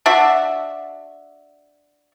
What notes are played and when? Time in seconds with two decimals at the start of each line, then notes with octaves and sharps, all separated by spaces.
0.06 D4 F#4 E5